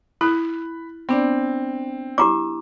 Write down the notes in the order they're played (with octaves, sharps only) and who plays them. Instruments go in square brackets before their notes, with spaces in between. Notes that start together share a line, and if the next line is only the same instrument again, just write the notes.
[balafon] E4 [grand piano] B5 F#6
[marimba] B3 D4 D5 [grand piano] C4
[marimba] E4 [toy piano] G4 A#5 D6